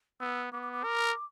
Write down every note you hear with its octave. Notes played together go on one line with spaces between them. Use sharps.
B3 E6
B3 D6
D6
D6
A#4